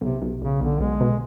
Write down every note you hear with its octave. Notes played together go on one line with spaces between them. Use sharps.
B1 C3
B1
B1 C#3
B1 D3
B1 G#3
B2